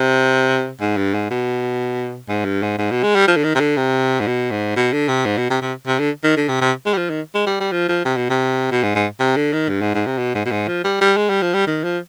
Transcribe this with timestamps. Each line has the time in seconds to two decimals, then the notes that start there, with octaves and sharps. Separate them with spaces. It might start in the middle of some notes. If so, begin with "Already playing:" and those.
Already playing: C3
0.81 G#2
0.97 G2
1.14 G#2
1.30 B2
2.29 G#2
2.45 G2
2.62 G#2
2.78 G#2
2.91 B2
3.03 G#3
3.15 G3
3.27 F3
3.36 D3
3.44 D#3
3.55 C3
3.60 D3
3.77 C3
4.20 G#2
4.27 B2
4.51 G#2
4.76 B2
4.93 D3
5.08 C3
5.25 G#2
5.37 B2
5.50 C3
5.62 C3
5.87 C3
5.99 D3
6.24 D#3
6.37 D3
6.49 C3
6.61 C3
6.86 G#3
6.93 G3
6.97 F3
7.10 D#3
7.35 G#3
7.47 G3
7.60 G3
7.72 F3
7.89 F3
8.05 C3
8.17 B2
8.30 C3
8.71 B2
8.83 G#2
8.95 G#2
9.20 C3
9.36 D3
9.53 D#3
9.69 G2
9.81 G#2
9.94 G#2
10.06 C3
10.18 B2
10.35 G#2
10.45 B2
10.51 G#2
10.68 F3
10.84 G3
11.01 G3
11.17 G#3
11.29 G3
11.42 F3
11.54 G3
11.67 D#3
11.84 F3